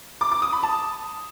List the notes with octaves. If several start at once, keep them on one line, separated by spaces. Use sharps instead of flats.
D6
D6
D#6
B5
A5